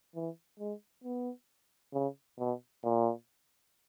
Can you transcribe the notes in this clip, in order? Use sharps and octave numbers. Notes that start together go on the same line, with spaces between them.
E3
G#3
B3
C#3
B2
A#2